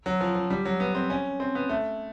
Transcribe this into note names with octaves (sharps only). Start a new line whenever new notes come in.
F#3
F3
F3
G3
F#3
B3
C4
C#4
C4
B3
A3